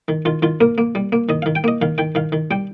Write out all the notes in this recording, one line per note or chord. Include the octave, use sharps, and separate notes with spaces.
D#3
D#3 F4
D#3 F4
A#3 A#4
A#3
G3
A#3
D#3 D#5
D#3 F5
G5
A#3 D#5
D#3 F5
D#3 G5
D#3 F5
D#3
G3 G5